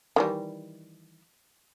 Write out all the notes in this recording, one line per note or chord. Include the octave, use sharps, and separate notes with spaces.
D#3 E3 G3